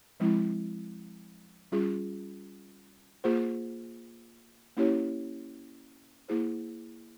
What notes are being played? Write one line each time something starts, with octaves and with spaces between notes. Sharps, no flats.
F3 G#3 C4 E4
G3 C#4 F4 G#4
A#3 F4 G#4 C5
A#3 C#4 E4 G4 C#5
A#3 E4 G#4 C5